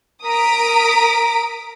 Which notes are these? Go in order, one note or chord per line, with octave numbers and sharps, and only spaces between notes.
A#4 A#5 D#6 B6 D7